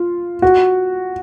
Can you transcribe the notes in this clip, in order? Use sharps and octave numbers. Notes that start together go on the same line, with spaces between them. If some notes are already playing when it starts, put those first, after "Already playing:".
Already playing: F4
F#4